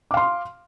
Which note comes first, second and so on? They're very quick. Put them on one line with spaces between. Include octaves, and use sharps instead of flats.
D6 F5 C6